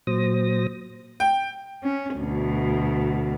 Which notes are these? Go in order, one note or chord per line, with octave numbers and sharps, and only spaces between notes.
A#2 F#3 C5 D#6 A#6
G5
C#4
D2 B2